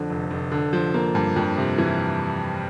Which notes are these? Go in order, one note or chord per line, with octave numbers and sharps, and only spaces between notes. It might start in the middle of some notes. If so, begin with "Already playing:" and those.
Already playing: F2 D3
F1
F1
D3
F3
A#3
G2
F2
C3
E3